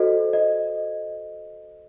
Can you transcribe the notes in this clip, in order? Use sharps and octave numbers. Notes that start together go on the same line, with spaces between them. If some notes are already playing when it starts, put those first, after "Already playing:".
Already playing: F#4 A4 C5 D#5
D#5